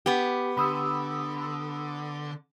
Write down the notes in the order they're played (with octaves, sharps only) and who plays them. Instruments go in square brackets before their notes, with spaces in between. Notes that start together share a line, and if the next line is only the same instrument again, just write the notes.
[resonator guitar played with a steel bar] B3 G4
[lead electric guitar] D3 [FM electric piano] B5 D#6 E6